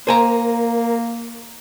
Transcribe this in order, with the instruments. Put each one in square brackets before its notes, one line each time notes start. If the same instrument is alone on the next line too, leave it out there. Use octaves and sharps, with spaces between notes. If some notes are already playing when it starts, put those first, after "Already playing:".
[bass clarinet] A#3 [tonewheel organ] A#4 [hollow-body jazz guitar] C5 G#5 A#5